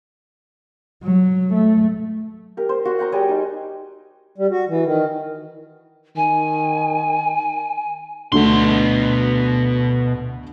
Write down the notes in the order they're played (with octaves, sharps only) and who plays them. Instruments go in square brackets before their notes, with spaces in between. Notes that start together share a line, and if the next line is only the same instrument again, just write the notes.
[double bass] F#3
A3
[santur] G4 A#4
C5
F#4 F#5
F#5 G5 A#5 D#6
G3 G#4 D5
D#4
[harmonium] G3
F#4
E3
D#3
[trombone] D#3 [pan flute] G#5
[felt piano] D2 D3 A3 [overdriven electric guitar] B2 C6